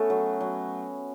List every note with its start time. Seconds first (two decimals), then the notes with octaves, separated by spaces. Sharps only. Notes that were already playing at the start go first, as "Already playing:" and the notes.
Already playing: A3 B3 C#4
0.10 F#3
0.41 F#3